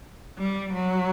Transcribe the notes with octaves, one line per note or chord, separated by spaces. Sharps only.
G3
F#3